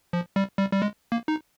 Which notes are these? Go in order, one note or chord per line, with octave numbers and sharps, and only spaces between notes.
F3
G3
G3
G3
G#3
A#3
D#4